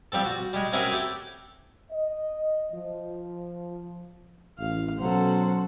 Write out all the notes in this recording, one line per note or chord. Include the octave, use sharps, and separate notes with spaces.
F3 G3 C4 A4
F#4
G3 G#3
C4 C#4 E4 F#4 G#4 A#4
G4 A4
D#5
F3
A1 F5
B2 F#3 C#4 A4 C5 F#5